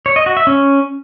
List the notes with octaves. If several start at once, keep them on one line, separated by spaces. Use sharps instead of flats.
C#5
D#5
F#4
E5
C#4